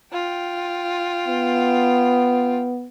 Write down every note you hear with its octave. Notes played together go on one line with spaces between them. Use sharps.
F4 G5
B3